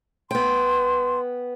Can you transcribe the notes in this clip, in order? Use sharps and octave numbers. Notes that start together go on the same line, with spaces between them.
B3 G5 C6